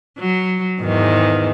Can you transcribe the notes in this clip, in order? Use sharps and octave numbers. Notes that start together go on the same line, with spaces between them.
F#3
E2 G#2 D#3